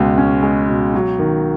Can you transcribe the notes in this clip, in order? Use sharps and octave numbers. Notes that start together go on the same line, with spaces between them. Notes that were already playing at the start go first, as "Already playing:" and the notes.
Already playing: C#2 B2 G#3
C#4
G#3
B2
F#3
D#3